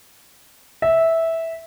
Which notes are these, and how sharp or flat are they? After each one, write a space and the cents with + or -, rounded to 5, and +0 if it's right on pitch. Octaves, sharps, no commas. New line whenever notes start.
E5 -10